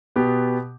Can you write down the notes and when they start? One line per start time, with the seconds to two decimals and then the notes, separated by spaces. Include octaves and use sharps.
0.16 B2 B3 G4